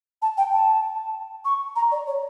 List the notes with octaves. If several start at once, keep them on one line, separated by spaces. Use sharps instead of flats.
A5
G5
A5
C#6
A#5
D5
C#5